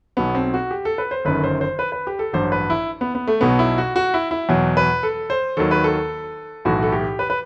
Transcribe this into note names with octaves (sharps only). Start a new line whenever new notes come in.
B1 B2 F#3 B3
C4
F#4
G4
A4
B4
C5
G1 F#2 D#3 B4
C5
C5
B4
B4
G4
A4
A1 G2 F#3 C5
B4
E4
B3
B3
A3
B1 B2 F#3 B3
E4
F#4
F#4
E4
E4
E2 B2 F#3
B4
A4
C5
D#2 D#3 F#3 A4
B4
A4
B1 A2 E3 F#4
A4
G4
B4
B4